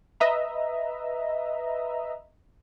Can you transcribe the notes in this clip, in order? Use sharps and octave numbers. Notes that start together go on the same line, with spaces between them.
B4 D#5 E5 A#5